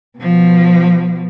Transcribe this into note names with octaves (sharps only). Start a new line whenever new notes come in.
B2 F3